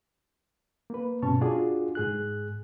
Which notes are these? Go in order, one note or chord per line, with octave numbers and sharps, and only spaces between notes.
A#3 B4
G2 B2 C#4 C#5 A5
D4 F4 F#4 G#4 D5
G#2 G#4 F#6